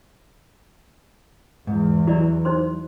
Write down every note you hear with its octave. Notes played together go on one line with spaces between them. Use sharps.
E2 G#2
F#3 E4 D5
D#4 C5 C6